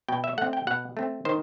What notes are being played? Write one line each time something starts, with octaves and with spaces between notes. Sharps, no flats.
B2 G5
E5
A3 C4 F#5
G5
B2 F#5
A3 C4
D#3 C5